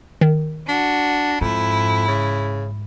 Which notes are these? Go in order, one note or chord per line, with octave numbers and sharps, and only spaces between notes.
D#3
D4 F#4
F2 G#2 E4
C#3